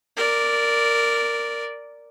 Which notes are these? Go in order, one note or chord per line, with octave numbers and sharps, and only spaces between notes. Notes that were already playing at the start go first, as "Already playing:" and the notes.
A#4 D5